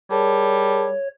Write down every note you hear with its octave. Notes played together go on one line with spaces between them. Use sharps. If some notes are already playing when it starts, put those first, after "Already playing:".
G3 G#4 A#4 C#5 A5